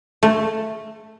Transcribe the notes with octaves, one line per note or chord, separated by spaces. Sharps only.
A3